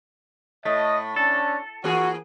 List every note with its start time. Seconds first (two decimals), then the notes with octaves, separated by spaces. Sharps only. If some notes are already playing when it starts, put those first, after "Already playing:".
0.65 A2 A3 D#5
1.16 C#4 D4 A4
1.84 E3 A#3 F#4 G#4